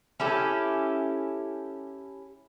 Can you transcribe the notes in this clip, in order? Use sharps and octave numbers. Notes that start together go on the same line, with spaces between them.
C#4 E4 G4 A4